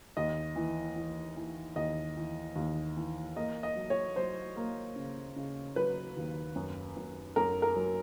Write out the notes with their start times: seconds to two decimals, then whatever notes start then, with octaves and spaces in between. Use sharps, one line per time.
0.17 D#2 D#5
0.56 E3
0.96 E3
1.36 E3
1.76 D#2 D#5
2.17 E3
2.56 D#2
2.97 E3
3.36 A#3 D#5
3.63 D#5
3.76 F#3
3.90 C#5
4.16 F#3 C5
4.56 A#3
4.96 C#3
5.36 C#3
5.76 F#3 B4
6.17 D#2
6.56 F#2
6.97 F#2
7.36 F#2 A#4
7.62 A#4
7.76 F#3